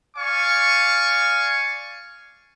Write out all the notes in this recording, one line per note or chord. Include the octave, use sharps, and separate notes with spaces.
D5 F5 G#5 C#6